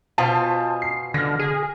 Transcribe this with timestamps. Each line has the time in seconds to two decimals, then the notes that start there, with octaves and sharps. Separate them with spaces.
0.18 B2 F4 C5 G#5 A5
0.82 C7
1.14 D3 F6 A#6
1.39 G#4